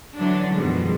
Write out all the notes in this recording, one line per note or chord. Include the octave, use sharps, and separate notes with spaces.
D3 E3 F#3 D4
F#2 B2 D#3 F3 G3 G#3